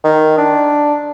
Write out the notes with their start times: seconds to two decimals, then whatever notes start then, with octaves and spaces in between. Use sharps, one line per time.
0.04 D#3
0.38 D4